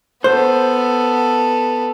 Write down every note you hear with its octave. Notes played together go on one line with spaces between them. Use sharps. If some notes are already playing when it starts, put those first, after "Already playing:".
B3 A4 C5